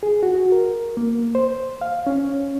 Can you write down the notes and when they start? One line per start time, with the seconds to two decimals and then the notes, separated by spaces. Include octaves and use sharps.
0.03 G#4
0.23 F#4
0.52 A#4
0.97 A#3
1.35 C5
1.81 F5
2.07 C#4